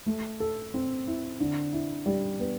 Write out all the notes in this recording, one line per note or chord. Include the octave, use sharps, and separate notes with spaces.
A3
A4
C4
E4
D3
E4
G3
B3